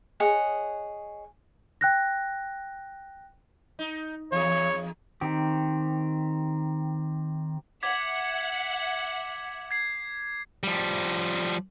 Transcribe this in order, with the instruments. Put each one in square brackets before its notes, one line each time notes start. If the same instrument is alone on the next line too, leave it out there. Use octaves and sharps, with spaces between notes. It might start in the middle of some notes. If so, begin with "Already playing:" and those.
[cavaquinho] G#4 C#5 D#5 F#5
[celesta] G5 F#6 A#6
[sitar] D#4
[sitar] E2 G#4 [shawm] C#5
[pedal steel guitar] D#3 C4 G4
[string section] E5 F#5 [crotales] D6 G#6 B6
[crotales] G#6 C7
[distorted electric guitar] F3 G3